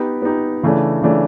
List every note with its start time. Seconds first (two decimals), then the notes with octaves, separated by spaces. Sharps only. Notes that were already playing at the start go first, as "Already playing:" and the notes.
Already playing: B3 D#4 G4
0.22 B3 D#4 G4
0.63 C#3 E3 A3 D4
1.02 C#3 E3 A3 D4